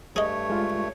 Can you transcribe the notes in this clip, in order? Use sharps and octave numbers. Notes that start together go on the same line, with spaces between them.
G2 A3 G#4 C#5 D#5
G#3 F4